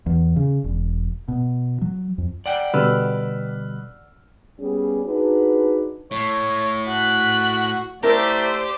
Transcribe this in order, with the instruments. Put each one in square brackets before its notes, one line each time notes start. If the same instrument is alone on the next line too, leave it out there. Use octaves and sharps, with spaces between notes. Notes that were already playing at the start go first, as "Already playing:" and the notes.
[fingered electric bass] E2
C#3
E1
B2
F#3
F2
[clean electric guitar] D5 F#5 G5
[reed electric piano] B2 D3 G3 [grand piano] B4 E6 F6
[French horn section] G3 B3 C#4 G#4
D4 D#4 F#4 G#4 B4
[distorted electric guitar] A2 [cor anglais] C#5
[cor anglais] F#4 [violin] F#6 B6
[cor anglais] A3 [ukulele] E4 A#4 [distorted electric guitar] G4 [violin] C5 D5